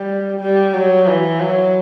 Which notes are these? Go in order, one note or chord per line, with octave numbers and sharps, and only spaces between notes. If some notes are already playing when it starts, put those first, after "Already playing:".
Already playing: G3
G3
F#3
E3
F#3